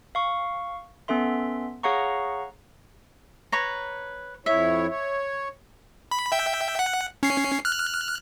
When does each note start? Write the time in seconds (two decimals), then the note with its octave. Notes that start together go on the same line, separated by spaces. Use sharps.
0.15 F5 C#6
1.08 B3 C#4 A4 E5 C6
1.83 G#4 C#5 F5 F#5 A#5 C#6
3.52 B4 C#5 A#5
4.46 F2 E4 C#5 E5
4.89 C#5
6.11 B5
6.32 E5 G5
6.79 F#5
7.23 C#4 C7
7.65 F6 F#6